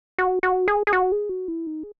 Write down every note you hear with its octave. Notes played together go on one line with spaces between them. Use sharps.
F#4
F#4
G#4
G#4
F#4
G#4
F#4
E4
D#4
G#4